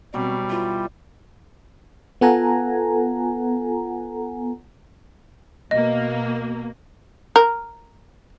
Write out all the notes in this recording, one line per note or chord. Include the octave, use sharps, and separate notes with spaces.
B2 F#3 G3 C4
E3 F4 B4
B3 F4 A4 F#5 G#5 A#5
B2 A#3 D#5
A#4